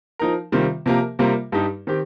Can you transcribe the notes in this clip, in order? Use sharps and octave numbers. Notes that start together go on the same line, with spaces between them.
F3 D#4 A#4
C3 D#3 G3 C4 F4
C3 F3 A#3 G4 A#4
C3 G3 A#3 F4 A#4
G2 G3 D#4 G4
D#3 C4 G4